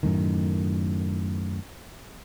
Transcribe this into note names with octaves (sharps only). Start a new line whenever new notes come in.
F#2 A2 D#3